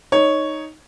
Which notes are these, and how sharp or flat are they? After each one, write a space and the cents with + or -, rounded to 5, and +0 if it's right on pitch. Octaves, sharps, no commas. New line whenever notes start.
D#4 +0 C#5 +0